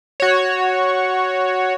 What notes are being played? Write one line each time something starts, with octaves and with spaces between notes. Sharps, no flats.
F#4 C#5